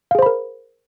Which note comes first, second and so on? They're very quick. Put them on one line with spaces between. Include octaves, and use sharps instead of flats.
F5 G#4 C5 B5 A#4